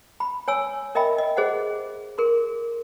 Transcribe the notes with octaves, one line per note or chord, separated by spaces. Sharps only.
B5
C#5 G#5 E6
A#4 D#5 E5 G5 B5
D#5
G#4 C5 D#5 F#5
G#4 A#4 C6